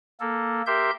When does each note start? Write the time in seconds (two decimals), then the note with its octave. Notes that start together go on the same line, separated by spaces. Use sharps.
0.20 A#3 A4
0.66 G4 A#4 E5 C6 G6